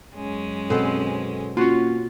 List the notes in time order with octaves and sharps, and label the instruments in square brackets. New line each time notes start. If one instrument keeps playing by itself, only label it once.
[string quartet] F#2 G#3 C#4
[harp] B2 C4 [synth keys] A4
[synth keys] A#3 C#4 [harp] F4 F#4